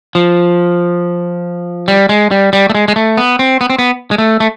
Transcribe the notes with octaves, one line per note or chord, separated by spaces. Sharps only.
F3
G3
G#3
G3
G3
A3
G#3
G#3
A3
B3
C4
B3
C4
B3
G#3
A3
A3